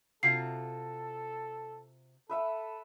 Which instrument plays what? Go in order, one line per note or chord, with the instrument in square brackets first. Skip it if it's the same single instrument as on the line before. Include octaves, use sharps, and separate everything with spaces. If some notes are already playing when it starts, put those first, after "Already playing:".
[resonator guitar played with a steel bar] C3 F4 F#4 [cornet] A4 [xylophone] C7
[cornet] A4 [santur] B4 E5 F#5